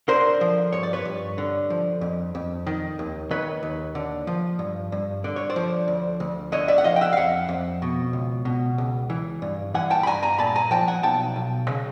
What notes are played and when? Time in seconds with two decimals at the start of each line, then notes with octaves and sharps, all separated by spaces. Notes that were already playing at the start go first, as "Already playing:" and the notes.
0.08 D3 A#4 C5
0.41 F3
0.73 G2 C#5
0.83 D5
0.93 B4 C#5
1.05 G2
1.38 D3
1.70 F3
2.01 F2
2.35 F2
2.67 D#3
2.99 D#2
3.31 D#3 B4 C#5
3.63 D#2
3.95 D3
4.27 F3
4.59 G2
4.92 G2
5.24 D3 D5
5.36 C#5
5.50 C5 D5
5.56 F3
5.88 D2
6.20 D2
6.52 D3 C#5 D#5
6.68 D5 E5
6.78 F#5
6.84 F3 D#5 F5
6.96 G5
7.01 E5 F#5
7.13 F5
7.17 F2 E5 F#5
7.49 F2
7.82 B2
8.13 C#2
8.45 B2
8.78 C#2
9.10 E3
9.42 G2
9.74 E3 F#5 G#5
9.91 G5 A5
10.03 B5
10.06 G2 G#5 A#5
10.23 G#5 A#5
10.38 A#2 A5 B5
10.56 G#5 A#5
10.71 F3 G5 A5
10.88 F#5 G#5
11.03 B1 G5 A5
11.36 B1
11.68 C#3